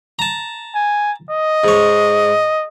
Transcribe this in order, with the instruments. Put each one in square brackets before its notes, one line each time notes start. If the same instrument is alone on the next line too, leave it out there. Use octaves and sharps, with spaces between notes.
[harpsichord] A5 A#5
[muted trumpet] G#5
D#5
[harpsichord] G#2 C#5